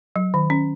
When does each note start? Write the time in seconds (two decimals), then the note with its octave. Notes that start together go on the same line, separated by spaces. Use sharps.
0.16 F#3
0.34 D#3
0.50 C#4